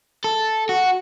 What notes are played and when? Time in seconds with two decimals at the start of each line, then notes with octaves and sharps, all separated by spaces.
0.24 A4
0.69 F#4